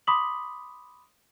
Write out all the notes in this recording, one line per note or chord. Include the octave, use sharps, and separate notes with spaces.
B5 C6 D6 D#6 B6 F#7